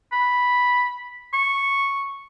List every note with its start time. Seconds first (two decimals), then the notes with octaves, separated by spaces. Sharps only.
0.12 B5
1.33 C#6